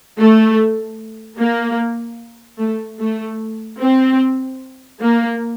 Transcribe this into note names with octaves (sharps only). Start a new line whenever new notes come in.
A3
A#3
A3
A3
C4
A#3